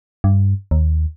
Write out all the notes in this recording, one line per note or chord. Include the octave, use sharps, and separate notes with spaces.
G2
D#2